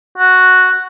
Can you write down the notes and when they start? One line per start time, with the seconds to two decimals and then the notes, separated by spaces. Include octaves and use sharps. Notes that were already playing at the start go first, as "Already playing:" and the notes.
0.18 F#4